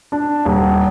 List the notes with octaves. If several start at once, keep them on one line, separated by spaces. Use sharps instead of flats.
D4
D#1